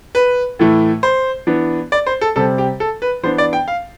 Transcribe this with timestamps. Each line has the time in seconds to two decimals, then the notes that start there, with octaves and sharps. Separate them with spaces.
0.15 B4
0.59 A2 E3 A3
1.03 C5
1.47 E3 B3 D4
1.92 D5
2.06 C5
2.21 A4
2.36 C3 G3 C4 A4
2.58 G4
2.80 A4
3.02 B4
3.23 E3 B3 D4 C5
3.38 D5
3.53 G5
3.68 F5